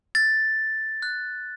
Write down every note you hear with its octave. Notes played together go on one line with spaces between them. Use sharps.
A6
F#6